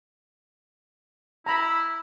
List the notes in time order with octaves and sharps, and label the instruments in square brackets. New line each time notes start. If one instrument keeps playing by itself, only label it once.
[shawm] E4 [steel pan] A#5 B5